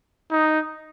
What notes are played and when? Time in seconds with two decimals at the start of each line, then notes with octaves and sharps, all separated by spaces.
0.31 D#4